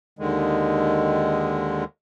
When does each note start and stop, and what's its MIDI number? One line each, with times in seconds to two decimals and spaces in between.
0.19 1.84 39
0.19 1.84 50
0.19 1.84 51
0.19 1.84 56